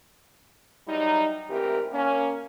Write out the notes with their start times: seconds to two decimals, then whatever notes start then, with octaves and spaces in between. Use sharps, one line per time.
0.87 E3 F#3 G3 D#4
1.49 D2 G#2 E3 C4 G4 A#4
1.92 A#3 C#4